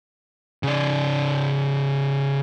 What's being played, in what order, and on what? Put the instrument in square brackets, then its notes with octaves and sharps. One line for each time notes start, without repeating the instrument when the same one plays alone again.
[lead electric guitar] C#3 D5